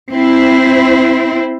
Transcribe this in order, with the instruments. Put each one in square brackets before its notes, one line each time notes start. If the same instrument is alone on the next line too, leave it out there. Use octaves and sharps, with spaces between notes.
[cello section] C4 E4 C5